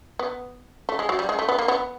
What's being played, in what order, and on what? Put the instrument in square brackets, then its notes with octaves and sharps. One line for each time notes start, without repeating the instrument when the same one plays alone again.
[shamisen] B3
A3
G#3
F#3
G3
G#3
A3
B3
A#3
B3